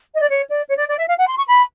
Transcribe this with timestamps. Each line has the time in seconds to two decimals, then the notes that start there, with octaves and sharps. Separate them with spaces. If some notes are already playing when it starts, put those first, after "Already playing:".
0.16 D#5
0.22 D5
0.29 C#5
0.48 D5
0.69 C#5
0.78 D5
0.89 D5
0.98 E5
1.08 F5
1.18 F#5
1.27 C6
1.37 C#6
1.48 B5